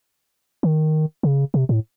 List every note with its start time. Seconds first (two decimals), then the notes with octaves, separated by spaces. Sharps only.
0.63 D#3
1.23 C#3
1.54 C3
1.69 A2